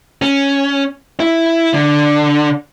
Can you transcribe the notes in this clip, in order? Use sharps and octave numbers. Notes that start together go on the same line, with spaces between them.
C#4
E4
D3